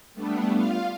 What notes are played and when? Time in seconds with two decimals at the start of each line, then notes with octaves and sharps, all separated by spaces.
0.13 G3 A3 B3 D4
0.53 F4 F5